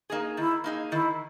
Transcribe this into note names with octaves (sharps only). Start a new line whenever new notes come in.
A#3 D#4 G#4
D#3 E4
A#3 D#4 G#4
D#3 E4